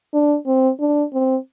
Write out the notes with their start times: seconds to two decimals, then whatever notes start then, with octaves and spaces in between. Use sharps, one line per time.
0.14 D4
0.47 C4
0.80 D4
1.13 C4